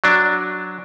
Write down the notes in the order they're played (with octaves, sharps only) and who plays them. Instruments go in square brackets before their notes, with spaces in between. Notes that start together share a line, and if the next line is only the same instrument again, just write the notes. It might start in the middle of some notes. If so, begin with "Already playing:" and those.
[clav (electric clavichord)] F#3 D4